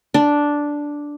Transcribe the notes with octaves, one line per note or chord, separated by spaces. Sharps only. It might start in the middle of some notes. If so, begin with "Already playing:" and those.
D4